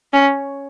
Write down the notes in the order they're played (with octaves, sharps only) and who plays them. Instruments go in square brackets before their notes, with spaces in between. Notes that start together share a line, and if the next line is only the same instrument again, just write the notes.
[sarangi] C#4